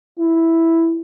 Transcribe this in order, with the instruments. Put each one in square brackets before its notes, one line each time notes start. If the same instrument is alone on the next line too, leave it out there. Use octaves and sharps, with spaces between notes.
[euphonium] E4